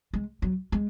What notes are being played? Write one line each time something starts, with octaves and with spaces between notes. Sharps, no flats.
G#3
F#3
G#3